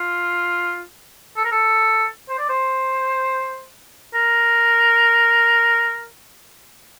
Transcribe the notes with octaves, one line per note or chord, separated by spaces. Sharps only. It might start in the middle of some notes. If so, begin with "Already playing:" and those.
Already playing: F4
A4
A#4
A4
C5
D5
C5
A#4